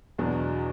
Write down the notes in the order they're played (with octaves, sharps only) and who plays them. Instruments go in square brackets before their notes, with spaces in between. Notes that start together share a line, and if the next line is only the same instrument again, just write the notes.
[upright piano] E2 B2 F#3 B3 D4